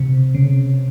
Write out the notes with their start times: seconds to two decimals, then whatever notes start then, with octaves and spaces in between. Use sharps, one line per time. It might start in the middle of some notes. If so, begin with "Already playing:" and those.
Already playing: C3
0.35 C#3